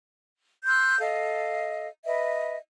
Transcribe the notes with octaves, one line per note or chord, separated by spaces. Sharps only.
C6 E6 F#6 G6
A4 D#5 F5
B4 D#5 E5